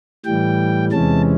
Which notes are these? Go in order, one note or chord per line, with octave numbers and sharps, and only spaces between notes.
A2 E3 G3 G5
E2 C3 E3 G#3 C#4 A5